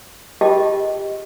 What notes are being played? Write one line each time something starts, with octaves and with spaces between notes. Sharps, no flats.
F4 G4 G#4 D#5 G5 A5